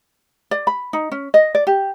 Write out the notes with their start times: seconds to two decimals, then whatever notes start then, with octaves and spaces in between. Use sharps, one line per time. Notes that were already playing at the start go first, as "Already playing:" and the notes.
0.51 D5
0.67 B5
0.93 D#4
1.12 C#4
1.34 D#5
1.55 D5
1.67 G4